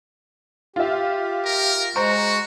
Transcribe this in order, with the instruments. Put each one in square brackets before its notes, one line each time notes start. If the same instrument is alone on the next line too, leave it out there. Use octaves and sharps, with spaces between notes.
[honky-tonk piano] F4 E5 [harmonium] G4
[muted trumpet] A#4
[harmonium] G#3 [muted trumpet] F#4 [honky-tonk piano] C5 A#5 C#6